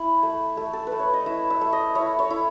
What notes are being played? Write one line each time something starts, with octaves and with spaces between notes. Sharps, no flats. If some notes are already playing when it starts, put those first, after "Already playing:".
Already playing: E4 B5
A3
A3
A4
B4
A3
C#5
D#5
E4 E5
E5
A3
D#5
E4 C#5
C#5
E4